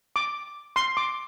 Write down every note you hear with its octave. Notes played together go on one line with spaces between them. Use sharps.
D6
C6
D6